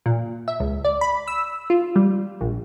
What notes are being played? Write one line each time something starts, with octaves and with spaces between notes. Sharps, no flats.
A#2
E5
C#2
D5
B5
E6
F4
G3
A#1